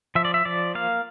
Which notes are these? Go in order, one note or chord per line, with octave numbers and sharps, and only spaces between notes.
F3 E5
D5
E5
F3 D5
A#3 F5